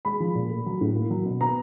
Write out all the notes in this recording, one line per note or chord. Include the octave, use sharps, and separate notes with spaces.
G#3 B5
F3
A#2
A3
F#3
A2
A#3
F#3
B2
B3 A#5